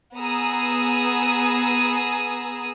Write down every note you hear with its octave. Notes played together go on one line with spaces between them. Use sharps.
B3 G#4 A#5 D#6 E6